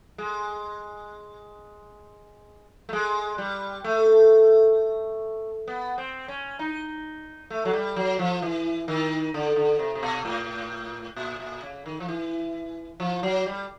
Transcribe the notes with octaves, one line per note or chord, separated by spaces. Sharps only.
G#3
A3
G#3
G3
A3
B3
C4
C#4
D#4
A3
F#3
G3
F#3
F3
E3
D#3
D3
D3
C3
C3
B2
A2
A#2
A#2
C#3
D#3
F3
E3
F3
F#3
G3